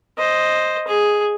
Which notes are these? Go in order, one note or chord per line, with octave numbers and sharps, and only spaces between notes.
C5 D#5
G#4